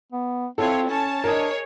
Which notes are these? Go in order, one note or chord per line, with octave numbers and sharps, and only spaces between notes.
B3
C4 E4 F4 A4 C#5
C#4 C#5 A5
D4 G#4 A#4 C#5 D#5